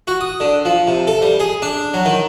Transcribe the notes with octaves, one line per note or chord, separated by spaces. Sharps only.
F#4
D#6
D3
F3
C3
A4
G3
G#4
D4
F#3
D#3